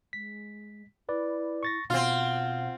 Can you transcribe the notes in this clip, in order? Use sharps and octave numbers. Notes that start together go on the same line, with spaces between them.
G#3 B6
E4 B4 D5
C#6 A6 A#6
B2 C4 F4 F5 F#5 F6